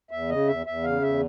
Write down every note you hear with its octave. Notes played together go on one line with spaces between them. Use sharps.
E2 E5
C#3 D#5
E2 E5
E2 E5
C#3 F5
E2 E5